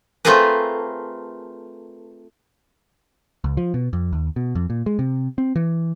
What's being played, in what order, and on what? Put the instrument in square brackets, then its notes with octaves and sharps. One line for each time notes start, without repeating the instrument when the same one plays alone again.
[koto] A3 C4 F4 G#4 A#4 B4
[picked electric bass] C#2
F3
B2
F2
D#2
B2
F2
A#2
G#3
C3
C4
E3